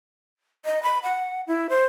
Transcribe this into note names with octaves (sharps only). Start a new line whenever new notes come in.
D#5
B5
F#5
E4
C5